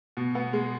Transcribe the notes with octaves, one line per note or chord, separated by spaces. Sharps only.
B2
B3
G#3